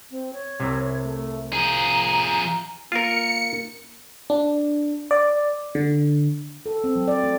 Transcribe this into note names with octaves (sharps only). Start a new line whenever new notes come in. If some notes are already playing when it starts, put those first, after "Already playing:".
C4
C#5
C2 C3
A3
F3 G#4 A#5
A#3 F4 A#4 C#7
D4
D5
D3
A4
C4
F#3
D5
A3